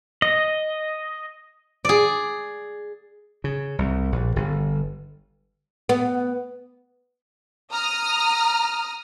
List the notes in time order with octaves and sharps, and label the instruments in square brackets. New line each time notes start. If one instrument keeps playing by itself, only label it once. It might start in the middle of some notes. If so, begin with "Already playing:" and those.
[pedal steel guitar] D#5
[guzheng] G#4 D5
[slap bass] C#3
C2
A#1
G1
[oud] B3
[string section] A#5 D#6 F6